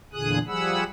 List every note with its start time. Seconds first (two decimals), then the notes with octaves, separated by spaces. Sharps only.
0.13 E2 A#2 D3 G#4 D#6 F#6
0.47 F3 G3 G#4 F#5 B5 E6